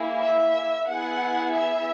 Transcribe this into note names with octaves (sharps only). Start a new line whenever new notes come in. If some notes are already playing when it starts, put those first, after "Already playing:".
Already playing: A#3 E4 G#4
E5
B3 E4 G#4 F#5
E5